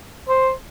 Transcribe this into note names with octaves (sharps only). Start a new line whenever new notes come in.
C5